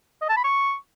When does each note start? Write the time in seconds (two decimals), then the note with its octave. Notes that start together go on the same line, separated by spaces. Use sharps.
0.22 D#5
0.29 A5
0.37 B5
0.44 C#6